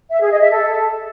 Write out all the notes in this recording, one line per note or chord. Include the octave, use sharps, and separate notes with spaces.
E5
G#4
D#5
E5
A4